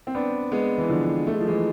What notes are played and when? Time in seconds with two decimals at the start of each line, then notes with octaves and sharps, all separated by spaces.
0.07 C4
0.15 B3 D4
0.52 G#3 B3
0.78 E3
0.89 D3 F3
1.27 A3
1.34 G#3
1.40 F3
1.47 E3 G#3